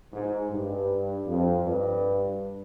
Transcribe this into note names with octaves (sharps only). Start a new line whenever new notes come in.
G#2
G2
F2
G2